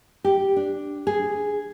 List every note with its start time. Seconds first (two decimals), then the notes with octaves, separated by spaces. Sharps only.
0.24 G4
0.56 D4
1.07 G#4